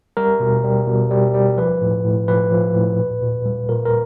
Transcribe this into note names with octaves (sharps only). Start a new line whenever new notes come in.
G3 A#4
B2
G3
B2
G3
G3
F3 B4
A2
A2
F3 B4
F3
A2
A#2
A#2
G3
A#2 A#4
A#4